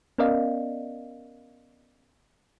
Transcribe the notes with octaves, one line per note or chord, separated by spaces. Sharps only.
B3 C#4 A#4 D5 D#5 F5